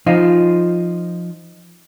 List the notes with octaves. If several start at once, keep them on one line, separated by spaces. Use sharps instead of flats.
F3 D#4 F4